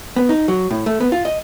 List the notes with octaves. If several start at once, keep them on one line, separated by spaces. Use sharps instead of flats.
B3
D#4
F#3
A2
A3
B3
F4
D#5